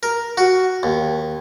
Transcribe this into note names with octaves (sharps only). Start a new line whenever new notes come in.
A#4
F#4
D#2